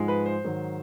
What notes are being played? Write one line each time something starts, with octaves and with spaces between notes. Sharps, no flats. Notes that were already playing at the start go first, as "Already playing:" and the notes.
Already playing: G#2 F3 G#3
B4
C5
G#2 D#3 F#3